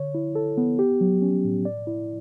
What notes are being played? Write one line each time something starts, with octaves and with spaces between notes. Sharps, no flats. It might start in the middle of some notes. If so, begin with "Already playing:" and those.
Already playing: D3 C#5
E4
A4
B3
G4
F#3
C#4
A2
D5
E4